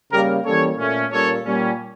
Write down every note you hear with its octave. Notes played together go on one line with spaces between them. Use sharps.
C#3 G3 A#3 G4 A#4
E3 G3 A#3 C#4 A4 C#5
A#2 A3 C#4
A#2 G3 A#3 C#4 A4 C#5
A#2 G3 C#4